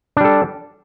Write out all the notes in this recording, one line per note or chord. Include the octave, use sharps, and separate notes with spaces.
G3 D4 A4